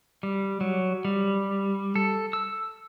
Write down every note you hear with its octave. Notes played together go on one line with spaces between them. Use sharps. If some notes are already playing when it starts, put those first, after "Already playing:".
G3
F#3
G3
A4
E6